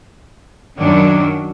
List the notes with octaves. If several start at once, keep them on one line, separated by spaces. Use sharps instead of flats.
F#2 D#3 F#3 D4